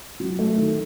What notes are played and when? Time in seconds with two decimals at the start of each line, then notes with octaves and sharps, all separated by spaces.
0.20 F#3
0.39 A3
0.58 D#3